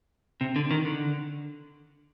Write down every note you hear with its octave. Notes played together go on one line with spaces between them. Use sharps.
C3
D3
D#3
D3